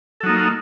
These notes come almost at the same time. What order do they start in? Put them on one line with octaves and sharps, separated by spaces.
A4 F#3 D#4 A#3